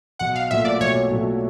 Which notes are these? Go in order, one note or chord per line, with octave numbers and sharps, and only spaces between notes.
B1 F#5
F5
A#2 F#3 A3 E5
D5
B1 C#5
A#2 F#3 A3